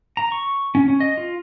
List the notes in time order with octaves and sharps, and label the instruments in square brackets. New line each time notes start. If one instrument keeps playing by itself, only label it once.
[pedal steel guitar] A#5
C#6
C#4
C#4
D#5
F4